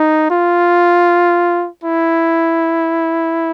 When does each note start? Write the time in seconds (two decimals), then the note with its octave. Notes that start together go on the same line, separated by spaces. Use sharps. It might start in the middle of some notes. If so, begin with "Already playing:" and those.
Already playing: D#4
0.30 F4
1.84 E4